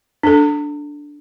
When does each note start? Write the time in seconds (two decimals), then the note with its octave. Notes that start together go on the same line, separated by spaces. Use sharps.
0.23 D4 A4